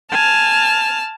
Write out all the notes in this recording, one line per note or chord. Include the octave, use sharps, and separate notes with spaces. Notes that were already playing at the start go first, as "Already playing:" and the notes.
G#5 A5 F6